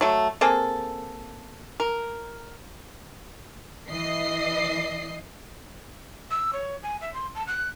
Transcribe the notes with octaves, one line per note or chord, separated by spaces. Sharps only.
F#3 A3
A#3 C4 G#4 A4
A#4
E3 D#5 C7
E6
C#5
G#5
E5
C6
A5
F#6